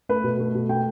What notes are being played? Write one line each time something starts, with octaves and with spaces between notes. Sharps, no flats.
A3 B4
B2
A3
B2
A3 G5